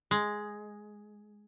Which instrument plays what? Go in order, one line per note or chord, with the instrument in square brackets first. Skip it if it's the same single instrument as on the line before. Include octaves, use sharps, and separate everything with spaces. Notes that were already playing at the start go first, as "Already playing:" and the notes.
[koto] G#3